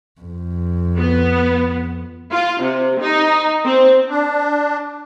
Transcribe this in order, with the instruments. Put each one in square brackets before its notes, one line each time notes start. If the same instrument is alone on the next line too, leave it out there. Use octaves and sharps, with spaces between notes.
[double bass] F2
[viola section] B3
[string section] F4
C3
D#4
C4
[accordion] D4